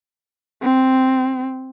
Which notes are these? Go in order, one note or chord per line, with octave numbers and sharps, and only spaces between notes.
C4